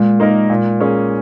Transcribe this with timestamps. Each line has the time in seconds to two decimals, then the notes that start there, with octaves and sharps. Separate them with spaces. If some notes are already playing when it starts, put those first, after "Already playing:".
Already playing: A#2 G#3
0.20 A#3 D#4 A#4
0.50 A#2
0.80 A#3 C#4 G#4